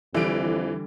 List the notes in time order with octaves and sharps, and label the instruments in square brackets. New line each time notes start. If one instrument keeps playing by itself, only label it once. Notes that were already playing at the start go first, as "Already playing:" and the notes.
[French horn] F2 [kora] D3 G3 [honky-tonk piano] E3 D7